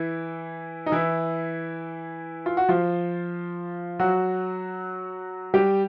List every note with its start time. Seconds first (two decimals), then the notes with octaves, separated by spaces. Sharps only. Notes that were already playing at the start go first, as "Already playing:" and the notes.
Already playing: E3 E4
0.86 D#4
0.92 E3 E4
2.46 F4
2.57 F#4
2.69 F3 F4
3.99 F#3 F#4
5.54 G3 G4